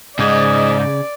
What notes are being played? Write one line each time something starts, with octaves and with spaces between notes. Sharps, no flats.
G#2 C#3 D5 D#5 G#5